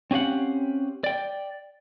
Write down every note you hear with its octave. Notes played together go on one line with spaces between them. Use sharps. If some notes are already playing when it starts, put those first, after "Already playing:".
C4 C#4 G4 F5 F#5
D5 G5